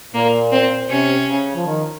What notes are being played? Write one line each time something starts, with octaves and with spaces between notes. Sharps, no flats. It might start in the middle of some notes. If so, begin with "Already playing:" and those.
A#2 A#3
C4
C3 C#4
C#3
F3
D#3